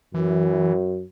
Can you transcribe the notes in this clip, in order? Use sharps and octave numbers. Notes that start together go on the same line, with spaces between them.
F#2 E3